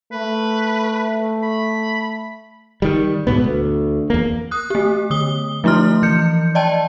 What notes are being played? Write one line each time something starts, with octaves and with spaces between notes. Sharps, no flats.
A3 B4
B5
D#3 G3
D2 G#2 B2 B3
D2
E2 A#3
D#6 F#6
A3 G4
D3 D#6 G7
F3 A3 E4 C6 F6
E3 G6 C#7
D5 D#5 G5 A5